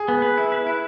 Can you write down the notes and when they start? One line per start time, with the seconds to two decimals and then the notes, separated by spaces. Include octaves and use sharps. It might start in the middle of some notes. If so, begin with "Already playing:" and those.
Already playing: G#4
0.08 B3
0.22 B4
0.37 E4
0.52 B4
0.67 E4